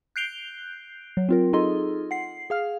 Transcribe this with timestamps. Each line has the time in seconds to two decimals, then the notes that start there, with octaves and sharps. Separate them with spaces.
0.16 F#6 G6 C7 D7 F7 G7
1.17 F#3
1.29 C4 F4 A#4
1.53 D#4 F4 G#4 A4 D#5 C6
2.11 F#5 C7
2.50 G#4 F5 F6